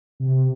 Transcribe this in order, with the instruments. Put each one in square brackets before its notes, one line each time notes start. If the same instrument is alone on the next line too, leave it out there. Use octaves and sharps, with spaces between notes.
[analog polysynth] C3